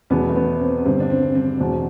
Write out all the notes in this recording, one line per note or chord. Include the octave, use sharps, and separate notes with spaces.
E2 B2 B3
A3
B3
C4
G2 D3 C4
D4
C4
C4
E2 B2